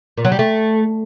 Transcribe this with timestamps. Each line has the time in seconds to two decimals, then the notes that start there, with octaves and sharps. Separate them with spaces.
0.17 A#2
0.25 F#3
0.32 G3
0.39 A3